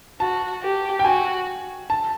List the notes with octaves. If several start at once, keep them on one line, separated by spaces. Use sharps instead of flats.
F#4 A5
G4
G5
F#4 G#5
A5